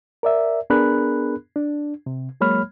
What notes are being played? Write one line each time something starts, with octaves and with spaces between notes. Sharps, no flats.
A#4 D5 E5
B3 D4 G#4 A#4 B5 F#6
D4
C3
F#3 G#3 A#3 C#5 B5 F6